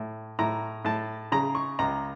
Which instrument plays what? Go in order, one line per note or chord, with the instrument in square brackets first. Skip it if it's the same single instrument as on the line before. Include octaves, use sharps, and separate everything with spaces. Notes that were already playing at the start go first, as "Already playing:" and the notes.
Already playing: [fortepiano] A2
A2 A#5
A2 A5
C#3 A#5
C#6
C#2 A#5